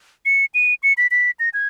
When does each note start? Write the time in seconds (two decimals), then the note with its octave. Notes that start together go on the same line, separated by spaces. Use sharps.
0.26 C#7
0.54 D#7
0.83 C#7
0.98 B6
1.11 B6
1.40 A#6
1.54 G#6